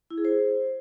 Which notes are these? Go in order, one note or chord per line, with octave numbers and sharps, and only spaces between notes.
E4
G#4
C5